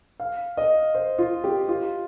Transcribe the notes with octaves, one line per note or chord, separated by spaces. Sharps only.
F5
D#5
C5
F4
G4
F4